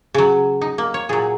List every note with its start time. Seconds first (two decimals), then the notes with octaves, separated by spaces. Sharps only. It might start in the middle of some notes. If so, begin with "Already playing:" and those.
0.14 C#3 F#3
0.61 D#4
0.78 A#3
0.94 C#5
1.09 A#2 F#3 G#4